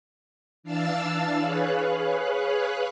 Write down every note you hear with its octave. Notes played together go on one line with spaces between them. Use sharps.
E3 D4 F5 A5 E6 A6
G#4 B4 C#5 F5 F#6